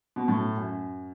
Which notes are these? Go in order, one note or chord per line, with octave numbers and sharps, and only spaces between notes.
B2
A2
F#2